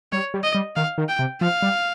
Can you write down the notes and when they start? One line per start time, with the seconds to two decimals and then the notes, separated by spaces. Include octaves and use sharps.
0.12 G3 C#5
0.34 G3
0.44 D#5
0.54 G3
0.76 D#3 F5
0.98 D#3
1.09 G5
1.19 C3
1.41 F3 F5
1.62 G3